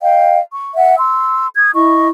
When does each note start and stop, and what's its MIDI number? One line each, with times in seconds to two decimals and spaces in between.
0.01 0.39 75
0.01 0.39 77
0.01 0.39 79
0.52 0.72 85
0.76 0.95 76
0.76 0.95 78
0.99 1.47 84
0.99 1.47 88
1.57 1.70 87
1.57 1.70 92
1.75 2.08 64
1.75 2.08 75
1.75 2.08 85